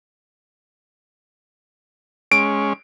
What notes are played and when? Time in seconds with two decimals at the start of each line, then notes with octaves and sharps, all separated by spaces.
2.32 G#3 C#4 D7